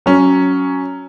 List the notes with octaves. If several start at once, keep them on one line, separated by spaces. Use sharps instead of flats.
F#3 C#4